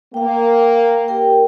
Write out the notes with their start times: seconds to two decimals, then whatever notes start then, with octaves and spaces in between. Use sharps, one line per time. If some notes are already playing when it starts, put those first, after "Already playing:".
0.14 A#3 F5 G5
1.08 G4 A#4 G5